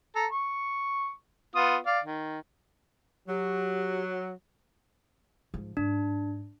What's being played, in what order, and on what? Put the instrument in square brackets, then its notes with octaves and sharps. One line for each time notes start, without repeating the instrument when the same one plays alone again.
[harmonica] A4 A#5
C#6
B3 F4 D#6
D5 F5
D#3
[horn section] F#3 [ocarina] G4
[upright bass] G#2 F3
[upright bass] G#2 [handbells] D4